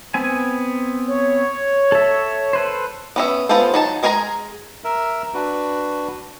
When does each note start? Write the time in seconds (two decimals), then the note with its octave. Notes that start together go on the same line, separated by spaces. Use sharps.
0.14 B3 C4 G#5
1.09 C#5
1.92 A4 E5
2.53 A4 B4 C5
3.16 B3 C#4 E5
3.49 B3 F4 G#4 A4 C5
3.74 F#3 D#4 A5
4.03 G#3 G#4 A#4 G#5 A#5
4.84 A#4 E5
5.34 D4 F#4 B4